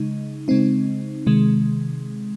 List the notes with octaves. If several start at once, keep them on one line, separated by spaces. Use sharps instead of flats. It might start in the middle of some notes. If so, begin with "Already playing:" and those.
Already playing: C#3 G#3 D#4
C#3 G#3 C4 D#4
C3 D#3 G#3